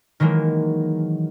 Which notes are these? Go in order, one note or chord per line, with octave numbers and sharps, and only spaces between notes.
D#3 E3 F#3 G#3 A#3